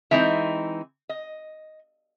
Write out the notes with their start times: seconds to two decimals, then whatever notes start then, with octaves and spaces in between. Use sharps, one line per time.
0.11 E3 G#3 C4 D#4 E5
1.09 D#5